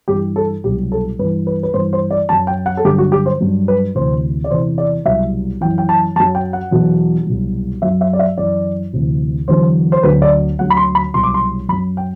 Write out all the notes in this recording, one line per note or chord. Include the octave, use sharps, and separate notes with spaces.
G2 E3 G4
A4
C2 B2 F#3 G4
A4
G2 E3 B4
B4
B4
G2 E3 C5
C5
D5
F#2 F#3 A5
G5
F#5
A4
G2 D3 F#3 G4
F#4
G4
C5
G2 F#3
B4
D2 C3 E3 C5
D5
E2 C3 E3 C5
D5
C2 B2 F#3 E5
F#2 E3 G5
G5
A5
F#2 F#3 A5
G5
F#5
E2 B2 F#3
C2 B2 F#3
F#2 F#3 E5
E5
D5
E5
F#2 E3 D5
D2 C3 E3
E2 D3 F#3 C5
C5
D2 D3 F#3 B4
D5
D2 D3 F#3 F#5
B5
C6
B5
C2 B2 F#3 C6
D6
C6
F#2 F#3 B5
G5